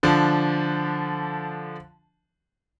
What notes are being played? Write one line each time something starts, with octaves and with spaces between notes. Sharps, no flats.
D3 F3 D4